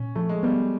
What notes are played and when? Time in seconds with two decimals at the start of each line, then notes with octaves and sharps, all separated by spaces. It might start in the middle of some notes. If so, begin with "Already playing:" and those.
Already playing: A#2 C#4
0.15 F3 A3
0.29 G#3
0.43 G3 B3